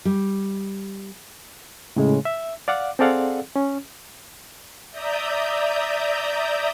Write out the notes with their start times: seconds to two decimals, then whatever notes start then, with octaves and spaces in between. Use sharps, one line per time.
0.05 G3
1.96 A2 C#3 G#3
2.25 E5
2.68 D5 F5 F#5 D6
2.99 C4 G#4 A4 D5 F5 F#5
3.56 C#4
4.91 D5 E5 A#5 D#6 G6